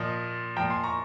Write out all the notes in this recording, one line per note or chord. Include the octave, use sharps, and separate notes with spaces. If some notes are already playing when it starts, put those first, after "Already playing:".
Already playing: A#2 F3 D#5
A#2 F3 G5 A#5
G#5 C6
A#5 C#6